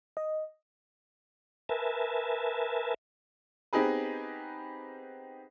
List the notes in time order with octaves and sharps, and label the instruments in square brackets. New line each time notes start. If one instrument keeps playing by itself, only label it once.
[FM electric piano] D#5
[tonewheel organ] A#4 B4 E5 G#5 A5
[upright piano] B3 C4 D#4 G4 G#4 B4